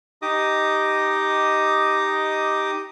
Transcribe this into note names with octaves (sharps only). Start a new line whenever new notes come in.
D#4 G4 D#5 D6 D#6